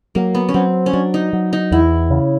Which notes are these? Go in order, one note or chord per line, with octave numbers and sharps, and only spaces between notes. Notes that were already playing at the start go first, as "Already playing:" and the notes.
F#3 A#3
B3
C#4
F#3 C4
C#4
F#3 D4
D#4
F#3
D#4
E2 E4
C#3